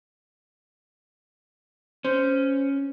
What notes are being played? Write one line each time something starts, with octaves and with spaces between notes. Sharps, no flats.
C#4 C5